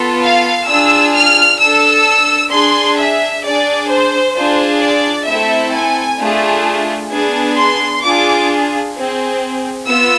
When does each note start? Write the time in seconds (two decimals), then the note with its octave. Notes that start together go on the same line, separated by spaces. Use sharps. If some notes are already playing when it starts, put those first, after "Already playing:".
Already playing: B3 F4 A4
0.22 F5
0.68 D4 F4 G#4 E6
1.14 F6
1.60 D4 A4 E6
2.51 D4 G#4 C6
2.97 E5
3.43 D4 G#4 D5
3.89 C5
4.35 D4 F4 G#4 C5
4.81 D5
5.27 A3 C4 E4 A4 E5
5.73 G#5
6.18 A3 D4 F4 G#4
7.10 B3 D4 G#4
7.56 C6
8.02 D4 F4 G#4 D6
8.94 C4 G#4
9.85 B3 F4 E6